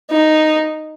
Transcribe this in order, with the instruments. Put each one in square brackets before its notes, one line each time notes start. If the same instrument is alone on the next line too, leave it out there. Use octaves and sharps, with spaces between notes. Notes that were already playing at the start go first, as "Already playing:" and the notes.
[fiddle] D#4